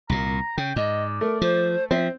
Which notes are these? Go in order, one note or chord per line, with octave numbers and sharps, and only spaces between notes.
C2 A#2 A#5
C#3 G5
G#2 D5 D#5
A3 A#4
F3 C5
F3 C4 E5